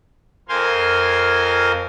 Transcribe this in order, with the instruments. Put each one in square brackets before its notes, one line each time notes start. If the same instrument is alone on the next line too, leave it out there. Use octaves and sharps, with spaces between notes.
[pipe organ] F2 A#4 C5 F5 G#5 C6